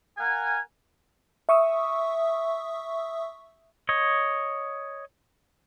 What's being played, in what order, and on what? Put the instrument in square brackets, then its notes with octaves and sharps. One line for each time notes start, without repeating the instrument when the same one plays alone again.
[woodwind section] A#4 F5 F#5 G#5
[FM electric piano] E5 C#6 D#6 E6
[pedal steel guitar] C#5 D#5